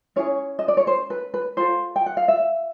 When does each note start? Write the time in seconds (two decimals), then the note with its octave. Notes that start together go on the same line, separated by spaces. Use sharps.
0.16 C#4 E4 G#4 C#5
0.59 D#5
0.68 D5
0.77 C#5
0.87 C5
1.10 B4
1.34 B4
1.57 F4 A4 C5
1.96 G5
2.06 F#5
2.17 F5
2.28 E5